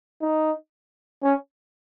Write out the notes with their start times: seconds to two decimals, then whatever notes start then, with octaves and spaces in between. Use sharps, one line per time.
0.22 D#4
1.23 C#4